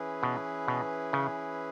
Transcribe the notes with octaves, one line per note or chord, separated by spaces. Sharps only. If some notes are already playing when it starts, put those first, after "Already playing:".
Already playing: E3 C#4 E4 G#4 B4
B2
B2
C#3